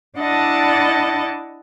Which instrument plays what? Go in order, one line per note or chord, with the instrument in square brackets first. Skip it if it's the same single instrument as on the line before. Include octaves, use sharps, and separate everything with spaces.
[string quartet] D4 E4 D5 D#5 F#5 A5